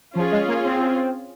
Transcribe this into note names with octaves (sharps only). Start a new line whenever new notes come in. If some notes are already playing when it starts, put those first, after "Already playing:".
F3 C#4 F4 G#4
G#3
A#3
C4